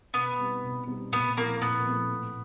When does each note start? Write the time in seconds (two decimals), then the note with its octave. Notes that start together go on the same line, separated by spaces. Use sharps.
0.14 B2 B3
0.38 G3 C4 D#4 G4
0.63 B2
0.87 G3 C4 D#4 G4
1.12 A#2 B3
1.36 F3 A3 A#3 C4 E4
1.62 A#2 B3
1.85 F3 A3 C4 E4
2.11 A2